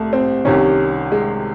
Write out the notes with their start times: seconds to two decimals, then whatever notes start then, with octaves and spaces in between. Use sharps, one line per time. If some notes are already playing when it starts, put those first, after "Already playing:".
Already playing: C2 A3
0.13 C4
0.45 C2 C3 D#3 C#4
1.12 G#3